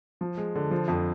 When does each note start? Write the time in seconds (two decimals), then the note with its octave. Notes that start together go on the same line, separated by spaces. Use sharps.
0.21 F3
0.37 G#3
0.55 D3
0.71 F3
0.88 F2